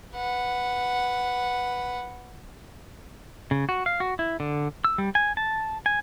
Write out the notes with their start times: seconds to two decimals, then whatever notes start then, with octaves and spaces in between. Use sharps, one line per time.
0.15 B4 F#5
3.51 C#3
3.69 F#4
3.86 F5
4.00 F#4
4.19 E4
4.40 D3
4.85 E6
4.98 G3
5.15 G#5
5.37 A5
5.86 G#5